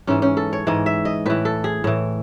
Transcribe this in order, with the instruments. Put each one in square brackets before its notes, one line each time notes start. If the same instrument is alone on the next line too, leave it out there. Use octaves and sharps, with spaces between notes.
[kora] G#2 E3 C#4
C#4
A4
C#5
G#2 E3 D#5
E5
D#5
A2 E3 B4
A4
G#4
A2 E3